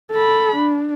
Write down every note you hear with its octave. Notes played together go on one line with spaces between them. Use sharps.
A4 B5
D4